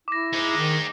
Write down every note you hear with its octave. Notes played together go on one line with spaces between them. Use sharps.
E4 D6 A#6
G#3 D#4
D#3